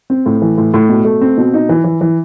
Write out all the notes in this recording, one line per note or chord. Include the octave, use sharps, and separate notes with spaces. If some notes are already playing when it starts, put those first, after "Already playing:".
C4
A2
E3
A2
A2
B2
A3
C4
B2
D#4
E3
E3
E3